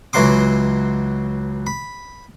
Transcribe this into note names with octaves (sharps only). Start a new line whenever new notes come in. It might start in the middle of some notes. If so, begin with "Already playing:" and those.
C#2 E3 F#3 F#4 C6 D6
B5